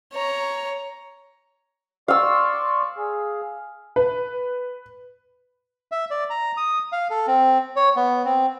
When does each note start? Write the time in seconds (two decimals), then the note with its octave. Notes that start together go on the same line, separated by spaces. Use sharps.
0.12 C#5 A#5
2.08 D5 F5 C6 C#6 E6
2.97 G#4
3.96 B4
5.92 E5
6.11 D5
6.30 A#5
6.57 D#6
6.92 F5
7.10 A4
7.27 C4
7.76 C#5
7.96 B3
8.25 C4